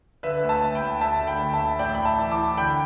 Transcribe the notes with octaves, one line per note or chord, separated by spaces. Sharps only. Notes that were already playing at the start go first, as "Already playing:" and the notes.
D3 B4 E5
D2
E5 A5
D2
G5 B5
D2
D2 E5 A5
D3
G5 B5
D2
E5 A5
D2
A1 D5 G5
A1 B5
E5 A5
E3
A5 D6
E3
D3 G5 B5